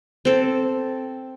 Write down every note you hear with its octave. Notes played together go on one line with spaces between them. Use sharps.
C4 A4